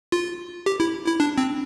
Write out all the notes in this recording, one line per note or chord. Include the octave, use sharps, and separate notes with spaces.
F4
G4
E4
E4
D4
C4